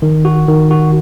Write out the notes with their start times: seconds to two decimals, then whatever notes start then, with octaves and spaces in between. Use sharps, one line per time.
0.02 D#3
0.25 F#4
0.48 D#3
0.71 F#4